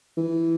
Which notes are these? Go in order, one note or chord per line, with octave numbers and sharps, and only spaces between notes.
E3